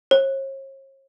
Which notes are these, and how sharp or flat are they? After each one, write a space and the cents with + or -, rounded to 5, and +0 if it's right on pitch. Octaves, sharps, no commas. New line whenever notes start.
C#5 -45